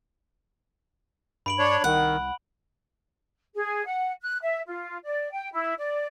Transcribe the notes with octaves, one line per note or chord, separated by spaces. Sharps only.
G2 B5 D7 F#7
D4 C#5
C2 D#3 F#5
G#4
F#5
F#6
E5
F4
D5
G5
E4
D5